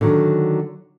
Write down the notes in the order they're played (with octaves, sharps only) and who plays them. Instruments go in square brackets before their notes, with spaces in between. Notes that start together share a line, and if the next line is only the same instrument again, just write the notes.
[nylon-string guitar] D3 D#3 F#3